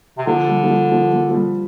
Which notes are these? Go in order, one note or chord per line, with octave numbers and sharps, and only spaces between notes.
C3
D3 F3
G3
F3
G3
F3
F3
F3
G3